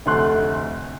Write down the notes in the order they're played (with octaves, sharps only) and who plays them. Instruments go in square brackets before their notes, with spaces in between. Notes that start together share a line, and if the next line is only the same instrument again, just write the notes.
[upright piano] F1 D2 A3 C6 F#6